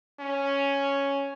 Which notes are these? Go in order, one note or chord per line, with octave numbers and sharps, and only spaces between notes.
C#4